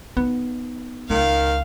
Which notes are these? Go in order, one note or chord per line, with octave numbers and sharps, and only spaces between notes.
B3 D#4
C#2 D#3 F5